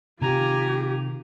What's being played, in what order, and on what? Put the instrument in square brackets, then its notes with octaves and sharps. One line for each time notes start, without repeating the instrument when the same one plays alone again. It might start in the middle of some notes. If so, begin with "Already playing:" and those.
[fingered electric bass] C3 D#3 [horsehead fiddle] F4 G4 [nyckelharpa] G#5 A#5